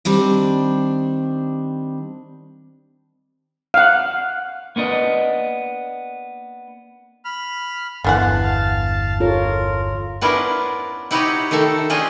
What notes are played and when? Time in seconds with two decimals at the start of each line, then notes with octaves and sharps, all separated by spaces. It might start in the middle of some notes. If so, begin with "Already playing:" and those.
0.05 D#3 G3 C4 D4
3.74 F5 F#5
4.76 A#3 B3 D4 D#5
7.25 B5 F6
8.04 G1 E2 D3 E3 F5 F#5 A5
9.20 F4 A4 A#4 C#5
10.21 B3 C#4 D4 E4 F4 A#4
11.11 D#4 E4 F#4 G4 C#5 D#5
11.51 D#3 A3 D#4 A4
11.90 C#4 D4 F4 G4 G#4 D#5